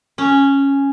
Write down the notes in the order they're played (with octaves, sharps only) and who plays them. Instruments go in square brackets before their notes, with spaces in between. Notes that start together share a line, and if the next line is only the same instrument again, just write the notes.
[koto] C#4